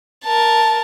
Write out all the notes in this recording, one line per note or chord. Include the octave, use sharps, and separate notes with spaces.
A#4 A5